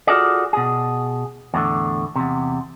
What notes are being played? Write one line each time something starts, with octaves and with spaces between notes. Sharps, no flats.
F4 F#4 G#4 A4 D5
B2 G#4
E2 A2 D3
E2 C3